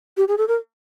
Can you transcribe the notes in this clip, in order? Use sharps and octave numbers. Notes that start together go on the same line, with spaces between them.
G4
G#4
A4
A#4